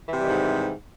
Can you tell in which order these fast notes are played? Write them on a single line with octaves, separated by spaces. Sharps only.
E3 C3 G3 D#3 G#2